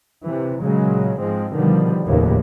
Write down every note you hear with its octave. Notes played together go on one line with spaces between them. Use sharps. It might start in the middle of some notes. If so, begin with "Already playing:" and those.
C3 E3
A#2 C#3 F#3 G#3
G#2 F3 G#3 C4
B2 D3 D#3 F3 G3
F1 D#2 A2 C#3 A#3 B3